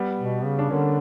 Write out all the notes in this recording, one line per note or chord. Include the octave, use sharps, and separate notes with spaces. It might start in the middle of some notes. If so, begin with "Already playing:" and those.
Already playing: G3 B3
B2
C#3
D4
D3 A#3 C#4